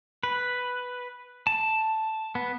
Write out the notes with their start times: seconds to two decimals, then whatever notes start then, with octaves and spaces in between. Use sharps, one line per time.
0.23 B4
1.47 A5
2.35 B3